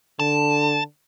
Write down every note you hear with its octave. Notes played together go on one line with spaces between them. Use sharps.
D3 A5